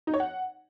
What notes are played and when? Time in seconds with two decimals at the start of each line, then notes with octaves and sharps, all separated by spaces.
0.07 D#4
0.14 C#5
0.20 F#5